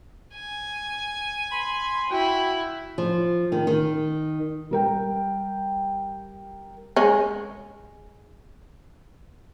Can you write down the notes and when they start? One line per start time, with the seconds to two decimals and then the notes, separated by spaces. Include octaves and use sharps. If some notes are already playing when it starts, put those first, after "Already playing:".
0.34 G#5
1.51 B5 C6
2.10 E4 F#4 G5
2.98 F3
3.52 D#3
3.67 D#3
4.71 G3 A#4 G5
6.96 G#3 C#4